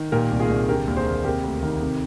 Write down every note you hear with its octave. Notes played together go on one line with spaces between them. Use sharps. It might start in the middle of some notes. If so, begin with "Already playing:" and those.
Already playing: D#3
A#2 G4 A#4
C2
F4 G#4
C2
D3 G4 A#4
D#2
G#4 C5
D#2
C3 G4 A#4
D2
D#3
C3